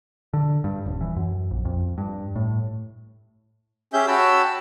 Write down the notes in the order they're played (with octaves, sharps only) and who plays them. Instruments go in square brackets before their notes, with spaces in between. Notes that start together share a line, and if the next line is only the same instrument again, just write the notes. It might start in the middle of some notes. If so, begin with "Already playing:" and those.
[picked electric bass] D3
G2
D#1
E3
F#2
A#1
F2
G2
A2
[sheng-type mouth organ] C#4 G4 G#4 E5 G6
F#4 C#5 G5 A5 B5 E6